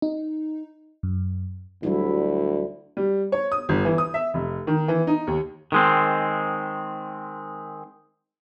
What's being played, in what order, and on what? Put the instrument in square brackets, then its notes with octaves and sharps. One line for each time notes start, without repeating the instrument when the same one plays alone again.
[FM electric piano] D#4
F#2
[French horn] D2 [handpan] F#3 G3 E4
[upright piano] G3
C#5
D#6
G1
E3
D#6
E5
F1
D#3
E3
D#4
D#2
[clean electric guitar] D#3 G#3 C4